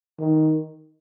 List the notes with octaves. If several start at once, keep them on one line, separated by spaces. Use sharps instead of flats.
D#3